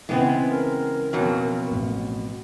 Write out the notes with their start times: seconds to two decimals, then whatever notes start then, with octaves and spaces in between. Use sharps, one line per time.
0.09 C#3 E3 G#3 B3 C4
0.50 A#4
1.13 F2 B2 F#3
1.71 A1